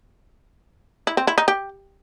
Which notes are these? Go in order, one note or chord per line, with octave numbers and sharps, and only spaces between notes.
E4
C4
E4
D#4
G4